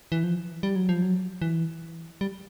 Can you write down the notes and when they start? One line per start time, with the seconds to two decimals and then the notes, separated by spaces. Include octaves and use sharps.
0.12 E3
0.24 F3
0.63 G3
0.76 F#3
0.89 F3
1.02 F#3
1.42 E3
2.21 G3